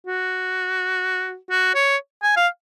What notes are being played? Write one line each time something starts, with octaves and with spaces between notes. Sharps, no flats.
F#4
F#4
C#5
G#5
F5